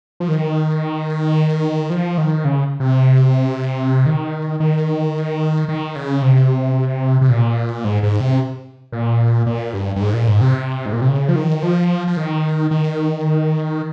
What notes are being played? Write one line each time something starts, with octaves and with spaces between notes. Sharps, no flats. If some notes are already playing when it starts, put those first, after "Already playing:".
F3
D#3
F3
D#3
C#3
C3
D#3
D#3
D#3
C#3
C3
C3
A#2
G#2
G#2
C3
A#2
A#2
G2
G2
G#2
A#2
G#2
C3
G#2
A#2
C3
C#3
F3
D#3
F3
F3
D#3
D#3